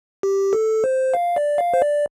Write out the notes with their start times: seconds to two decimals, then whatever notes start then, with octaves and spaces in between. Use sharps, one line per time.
0.23 G4
0.53 A4
0.84 C5
1.14 F5
1.36 D5
1.58 F5
1.74 C5
1.82 D5